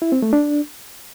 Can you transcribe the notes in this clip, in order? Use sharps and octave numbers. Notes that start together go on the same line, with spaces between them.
E4
C4
A3
D4